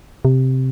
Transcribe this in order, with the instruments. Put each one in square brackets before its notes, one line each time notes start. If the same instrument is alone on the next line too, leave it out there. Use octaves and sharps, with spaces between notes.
[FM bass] C3